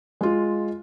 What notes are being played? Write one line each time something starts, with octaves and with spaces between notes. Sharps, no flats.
G#3 F4